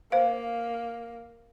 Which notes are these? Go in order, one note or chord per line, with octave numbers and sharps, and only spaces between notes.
A#3 C5 F5